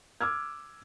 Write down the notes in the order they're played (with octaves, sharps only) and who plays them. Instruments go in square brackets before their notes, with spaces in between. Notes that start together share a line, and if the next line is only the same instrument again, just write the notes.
[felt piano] D6 E6 F6 G#6